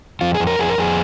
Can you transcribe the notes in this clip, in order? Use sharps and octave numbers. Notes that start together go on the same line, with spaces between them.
F2 F4
G#4
F2
A#4
F2 G#4
A#4
F2 G#4